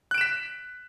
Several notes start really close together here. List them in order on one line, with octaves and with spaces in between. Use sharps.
F#6 D7 E7 B6